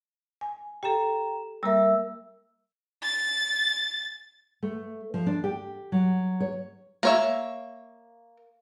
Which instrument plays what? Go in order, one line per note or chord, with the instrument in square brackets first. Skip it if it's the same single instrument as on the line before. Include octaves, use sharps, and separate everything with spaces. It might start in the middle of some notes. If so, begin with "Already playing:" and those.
[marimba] G#5
[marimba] G4 A4 [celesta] G5 A#5 E7
[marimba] G3 A#3 A#4 [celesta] E5 E6
[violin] A6
[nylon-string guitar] A3
F3
D4
G4
F#3
C#5
[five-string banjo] A#3 C#5 E5